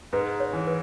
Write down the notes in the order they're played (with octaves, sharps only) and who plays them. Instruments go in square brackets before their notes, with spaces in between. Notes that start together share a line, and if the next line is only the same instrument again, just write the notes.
[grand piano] G#2 [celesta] B4
[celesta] C#5
[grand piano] E3
[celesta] B4